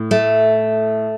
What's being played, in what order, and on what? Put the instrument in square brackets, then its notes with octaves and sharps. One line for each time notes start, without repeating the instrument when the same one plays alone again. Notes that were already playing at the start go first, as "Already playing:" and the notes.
Already playing: [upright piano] A2
[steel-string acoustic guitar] A3